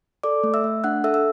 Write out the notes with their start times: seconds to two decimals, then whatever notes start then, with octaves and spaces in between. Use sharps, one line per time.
0.23 A4 D5 D6
0.44 A3
0.54 E5 E6
0.64 A3
0.84 D4 F#5 F#6
1.04 A4 E5 E6
1.14 E6